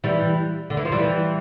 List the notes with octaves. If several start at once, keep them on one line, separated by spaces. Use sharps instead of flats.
E3 G3
D3
E3
F3
E3 G3